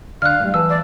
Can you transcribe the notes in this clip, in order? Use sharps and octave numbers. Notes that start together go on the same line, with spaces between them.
D3 F5 F6 F#6
A2 G3
E3 B4 A5 E6
D5